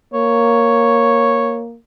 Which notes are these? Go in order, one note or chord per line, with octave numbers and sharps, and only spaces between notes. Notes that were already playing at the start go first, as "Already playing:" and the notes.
A#3 C#5